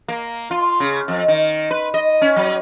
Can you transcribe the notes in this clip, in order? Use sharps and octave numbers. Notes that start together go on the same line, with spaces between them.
A#3
F4
C#3
F2
D#3
B4
D#5
C#4
F#3